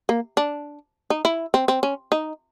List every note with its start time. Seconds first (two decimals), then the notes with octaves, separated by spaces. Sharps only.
0.09 A#3
0.37 D4
1.10 D#4
1.25 E4
1.54 C4
1.68 C4
1.83 C#4
2.12 D#4